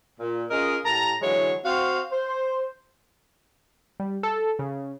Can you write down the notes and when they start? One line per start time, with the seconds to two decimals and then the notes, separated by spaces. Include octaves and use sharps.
0.20 A#2
0.51 C#4 F4 G#4 A#4 D#5
0.85 A2 G4 A5 A#5
1.21 D3 E3 F#3 G#3 E4 C#5
1.64 C4 F#4 F5
2.11 C5
4.00 G3
4.23 A4
4.59 C#3